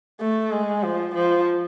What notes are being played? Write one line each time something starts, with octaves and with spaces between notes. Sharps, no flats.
A3
G#3
F3
F3